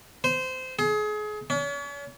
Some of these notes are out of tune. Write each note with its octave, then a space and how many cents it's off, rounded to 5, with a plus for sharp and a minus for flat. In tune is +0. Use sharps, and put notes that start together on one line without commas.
C5 -20
G#4 +30
C#4 +40